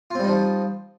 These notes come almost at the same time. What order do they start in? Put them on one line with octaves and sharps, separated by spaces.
F4 C4 G3 D#4 F3